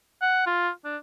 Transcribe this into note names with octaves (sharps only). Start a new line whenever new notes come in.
F#5
F4
D4